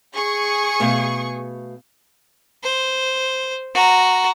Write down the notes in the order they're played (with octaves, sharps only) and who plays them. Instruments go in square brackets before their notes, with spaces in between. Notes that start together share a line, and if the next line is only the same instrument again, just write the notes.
[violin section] G#4 C#6
[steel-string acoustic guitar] B2 A3 F5
[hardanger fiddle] C5
F#4 A#5